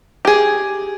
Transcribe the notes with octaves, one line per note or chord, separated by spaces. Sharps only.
G4 G#4